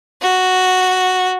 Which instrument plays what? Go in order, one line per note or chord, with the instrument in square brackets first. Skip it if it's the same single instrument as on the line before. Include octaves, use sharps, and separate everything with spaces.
[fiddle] F#4